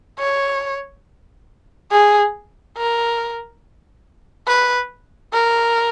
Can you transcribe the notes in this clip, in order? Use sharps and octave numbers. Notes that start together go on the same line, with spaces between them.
C#5
G#4
A#4
B4
A#4